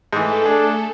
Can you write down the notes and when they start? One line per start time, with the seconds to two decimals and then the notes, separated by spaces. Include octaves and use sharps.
0.13 G#2 E3 A3 A4
0.45 D4 G#4